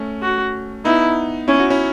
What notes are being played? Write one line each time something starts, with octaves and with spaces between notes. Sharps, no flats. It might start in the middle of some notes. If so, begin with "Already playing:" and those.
Already playing: A3 C#4
F#4
B3 D#4 E4
C#4 E4
F#4
C#4 E4